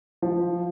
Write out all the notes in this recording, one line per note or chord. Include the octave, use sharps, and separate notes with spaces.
F3